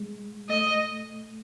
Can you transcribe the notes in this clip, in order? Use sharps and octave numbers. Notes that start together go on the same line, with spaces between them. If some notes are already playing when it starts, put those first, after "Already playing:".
Already playing: G#3
A3 D#5